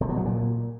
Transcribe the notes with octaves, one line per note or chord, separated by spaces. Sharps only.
C3
B2
F#3
A#2